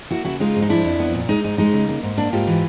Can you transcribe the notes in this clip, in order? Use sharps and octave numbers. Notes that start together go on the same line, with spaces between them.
A#3 E4 F#4
C#3 E4 F#4
G#3 D#4 F4
G#2
D#4
F3 D4 E4
F2
B3
A#2
G#3 D#4
G#2 D#4
G#3 D#4
C#3
A#3
G#2
A#3 D4
G#2 F4 G4
E3